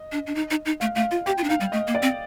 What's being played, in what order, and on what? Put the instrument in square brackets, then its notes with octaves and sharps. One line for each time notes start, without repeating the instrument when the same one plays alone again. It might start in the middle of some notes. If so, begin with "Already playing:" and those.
Already playing: [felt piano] D#5
[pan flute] D4
D4
D#4
D#4
D#4
[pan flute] A3 [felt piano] F5
[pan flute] A3 [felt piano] F5
[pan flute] F4
[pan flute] G4 [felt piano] G5
[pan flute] F4
D4
[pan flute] D#4 [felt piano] F5
[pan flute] G3
[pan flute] A3 [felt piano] D#5
[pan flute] A#3
[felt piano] D5
[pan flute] C4